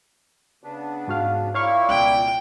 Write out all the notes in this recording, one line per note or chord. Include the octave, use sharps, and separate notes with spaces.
C#3 B3 D4
G#2 F#4 F5
A#2 A#3 E4 C#5 F5 C#6
C#2 B2 G5